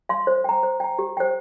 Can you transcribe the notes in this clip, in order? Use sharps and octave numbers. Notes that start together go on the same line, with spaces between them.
F5 C6
C5
G5 A#5
C5
G5 A#5
G4
C5 G5